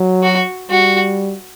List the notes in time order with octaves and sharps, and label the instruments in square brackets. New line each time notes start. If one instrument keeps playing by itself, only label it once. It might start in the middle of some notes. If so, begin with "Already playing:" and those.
Already playing: [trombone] F#3
[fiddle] F#4
[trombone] G3 [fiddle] F#4